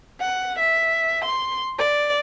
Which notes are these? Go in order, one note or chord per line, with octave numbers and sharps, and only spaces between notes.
F#5
E5
C6
D5